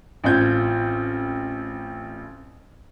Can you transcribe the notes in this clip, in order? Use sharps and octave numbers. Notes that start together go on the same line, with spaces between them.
A1 C4 F4 G6 G#6